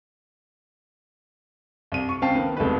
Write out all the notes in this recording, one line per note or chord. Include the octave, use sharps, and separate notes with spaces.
C2 D#7
C#6
C#2 C4 F5 G5 A5 C7
D#3 B3
E1 C2 A3 D#4 B4